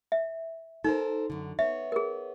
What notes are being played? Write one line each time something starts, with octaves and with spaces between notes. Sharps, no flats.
E5
D#4 A4 A#4 C5
F#2 D3
B3 C#5 E5
G#4 A#4